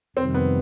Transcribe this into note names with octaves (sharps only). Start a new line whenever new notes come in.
F2 C3 D#3 G3 C4
B3